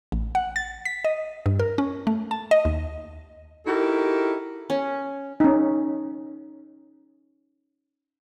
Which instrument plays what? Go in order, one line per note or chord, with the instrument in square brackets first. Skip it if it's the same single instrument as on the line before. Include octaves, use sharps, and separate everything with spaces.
[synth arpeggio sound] A1
F#5
A6
B6
D#5
G2
A#4
C#4
A3
A5
D#5
D#2
[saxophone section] D#4 E4 F#4 G4 A4 A#4
[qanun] C#4
[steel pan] C#4 D#4